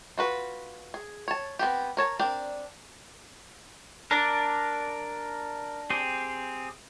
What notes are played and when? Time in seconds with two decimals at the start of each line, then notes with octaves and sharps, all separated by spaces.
0.17 F4 F#4 B4
0.94 G#4
1.28 C#5 A5
1.59 B3 C4 G4
1.97 A#4 C#5 A5
2.19 C4 D4 A#4 D5 G5
4.11 D4 A#4 D5
5.90 C4 G4 G#4